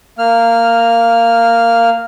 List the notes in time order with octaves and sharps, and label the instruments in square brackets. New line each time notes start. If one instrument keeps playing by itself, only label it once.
[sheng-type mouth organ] A#3 F6